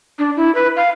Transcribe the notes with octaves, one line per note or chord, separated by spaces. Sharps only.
D4
E4
B4
F5